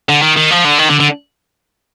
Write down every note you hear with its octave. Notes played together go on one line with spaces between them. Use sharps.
D3
D#3
D#3
F3
D3
D#3
D3
D3